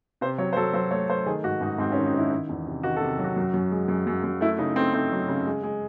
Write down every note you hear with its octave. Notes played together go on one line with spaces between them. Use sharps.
C3 C5
F#3 C#5
C5
F#3 A4
F#3 C5
A3 C#5
A3 C5
D#3 G#4
G#2 F#4
G#2 D#4
G#2 C4
C#4
D#3
D#4
D#3 E4
D#3
E2
C3
D#3 F#4
A4
C3
F#3 F#4
F#2
F#2
G#3
F#2
F#2
F#2
A3 E4
C#3 D#4
A3 C4
A3 C4
F#3
C#3
G#3
G#3